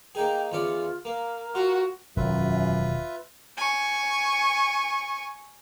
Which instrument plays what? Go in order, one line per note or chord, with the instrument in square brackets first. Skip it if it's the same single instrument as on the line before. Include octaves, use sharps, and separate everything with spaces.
[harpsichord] A#3 D#4 G#4 [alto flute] G5
[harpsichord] E2 C#4 D5 [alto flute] F4
[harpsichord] A#3 [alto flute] A#4
[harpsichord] F4 [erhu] F#4
[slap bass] E1 D#3 [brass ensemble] F#2 [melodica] F4 B4 E5
[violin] G#5 C#6